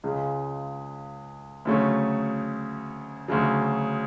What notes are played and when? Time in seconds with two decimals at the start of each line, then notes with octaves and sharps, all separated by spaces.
0.04 C#2 C#3 G#3
1.65 D2 C#3 F#3 A3 C#4
3.28 D2 C#3 F#3